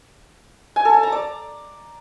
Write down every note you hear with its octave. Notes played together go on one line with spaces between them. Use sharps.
G#5
A4
A5
A#5
D5